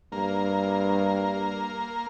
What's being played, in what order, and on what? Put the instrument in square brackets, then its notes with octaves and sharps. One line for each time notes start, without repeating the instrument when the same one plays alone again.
[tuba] G2 [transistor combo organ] A#3